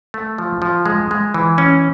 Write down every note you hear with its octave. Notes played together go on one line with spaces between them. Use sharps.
A3
F3
F3
G#3
G#3
E3
C#4